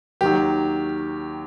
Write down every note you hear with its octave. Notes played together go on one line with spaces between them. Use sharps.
D#2 D#3 F#3 G4